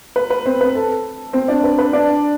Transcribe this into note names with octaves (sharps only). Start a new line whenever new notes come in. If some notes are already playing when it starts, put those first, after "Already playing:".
B4
B4
C4 C5
B4
A4
C4 C5
D4 D5
B4
B4
D4 D5